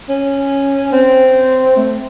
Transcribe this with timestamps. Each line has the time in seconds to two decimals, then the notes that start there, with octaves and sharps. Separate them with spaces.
0.09 C#4
0.93 C4
1.77 A3